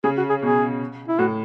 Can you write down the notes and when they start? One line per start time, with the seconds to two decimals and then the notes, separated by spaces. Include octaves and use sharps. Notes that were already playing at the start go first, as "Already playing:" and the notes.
0.04 C#3 G#4
0.17 F#4
0.29 G#4
0.42 B2 G#4
1.08 E4
1.19 A2 F#4